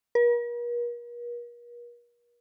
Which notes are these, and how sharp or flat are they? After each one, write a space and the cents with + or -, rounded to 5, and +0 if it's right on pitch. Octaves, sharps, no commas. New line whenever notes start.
A#4 +45